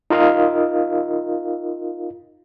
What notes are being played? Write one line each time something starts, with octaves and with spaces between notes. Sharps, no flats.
D#4 F4 A#4 D#5 F5